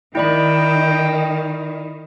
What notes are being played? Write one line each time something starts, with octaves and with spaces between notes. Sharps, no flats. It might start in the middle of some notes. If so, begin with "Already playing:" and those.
D#3 E4 D5 G5 B5